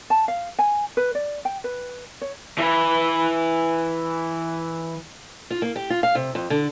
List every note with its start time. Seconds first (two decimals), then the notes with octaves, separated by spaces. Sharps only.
0.10 A5
0.28 F5
0.58 G#5
0.97 B4
1.15 D5
1.45 G5
1.64 B4
2.21 C#5
2.58 E3 B4
5.50 F4
5.62 A#3
5.76 G4
5.90 F4
6.03 F5
6.15 C3
6.35 F2
6.50 D3